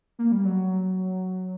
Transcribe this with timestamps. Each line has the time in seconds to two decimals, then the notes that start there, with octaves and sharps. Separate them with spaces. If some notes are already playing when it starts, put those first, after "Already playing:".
0.19 A#3
0.32 G3
0.45 F#3